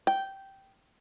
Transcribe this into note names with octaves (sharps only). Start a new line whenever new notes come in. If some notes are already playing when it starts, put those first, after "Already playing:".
G5